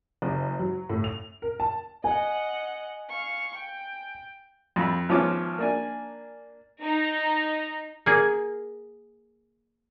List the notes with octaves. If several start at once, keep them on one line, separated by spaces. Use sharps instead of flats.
F#1
F#3
A2
F7
A#4
A5
D#5 F#5 G#5
F5 C#6
G5
F2 B5
G#1 F3 B3 C#4 D6
A#3 D4 G#5
D#4
A#3 G#4